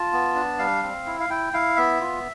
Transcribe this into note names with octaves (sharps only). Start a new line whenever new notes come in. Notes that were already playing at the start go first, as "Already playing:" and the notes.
Already playing: F4 A5
B3
D4
G3 F5
C4
E4
F5
E4 G5
E4 F5
B3 E5
F4